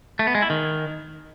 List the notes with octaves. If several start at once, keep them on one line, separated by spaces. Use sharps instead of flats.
A3
B3
G#3
E4
D#3